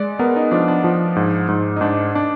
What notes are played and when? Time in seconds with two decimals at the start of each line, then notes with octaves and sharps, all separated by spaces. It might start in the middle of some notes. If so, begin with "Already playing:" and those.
Already playing: G#3 D5
0.19 B3 A#4
0.36 D#4
0.51 F3 D4
0.68 D4
0.84 F3
1.16 G#2
1.49 G#2
1.76 D#4
1.81 G#2 D4
2.15 D4